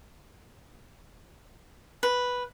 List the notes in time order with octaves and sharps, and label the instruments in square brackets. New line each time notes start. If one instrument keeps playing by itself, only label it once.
[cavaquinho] B4